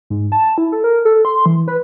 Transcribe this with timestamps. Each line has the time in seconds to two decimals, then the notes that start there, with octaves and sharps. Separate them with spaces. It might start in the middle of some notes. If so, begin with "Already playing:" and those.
0.10 G#2
0.32 A5
0.58 E4
0.72 A4
0.84 A#4
1.05 A4
1.25 C6
1.46 E3
1.68 B4